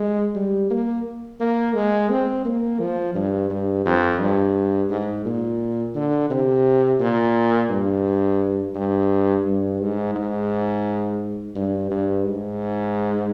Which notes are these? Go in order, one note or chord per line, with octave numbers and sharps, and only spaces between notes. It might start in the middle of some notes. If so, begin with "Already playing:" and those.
Already playing: G#3
G3
A#3
A#3
G#3
C4
A#3
F3
G2
G2
F2
G2
G#2
A#2
D3
C3
A#2
G2
G2
G2
G#2
G#2
G2
G2
G#2